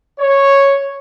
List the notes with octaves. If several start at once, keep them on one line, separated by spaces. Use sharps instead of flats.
C#5